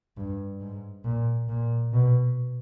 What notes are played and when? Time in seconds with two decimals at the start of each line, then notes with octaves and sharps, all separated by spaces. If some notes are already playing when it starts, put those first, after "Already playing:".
0.17 G2
0.60 G#2
1.05 A#2
1.48 A#2
1.93 B2